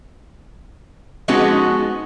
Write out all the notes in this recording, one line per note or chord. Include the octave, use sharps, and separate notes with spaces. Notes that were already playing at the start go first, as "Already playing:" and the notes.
F3 G#3 B3 C#4 D#4 F#4